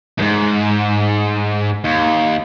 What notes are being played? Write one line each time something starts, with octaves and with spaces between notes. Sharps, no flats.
D#2 G#2
D#2